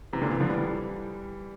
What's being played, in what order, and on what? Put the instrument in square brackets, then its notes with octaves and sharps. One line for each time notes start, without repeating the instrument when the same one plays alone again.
[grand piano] C3 E3
A#2 D3
C3 E3
D3 F3
E3 G3